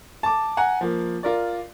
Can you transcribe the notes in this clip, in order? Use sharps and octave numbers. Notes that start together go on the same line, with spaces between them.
A5 D6
F#5 G#5 A#5
F3 A#3
F4 A#4 D5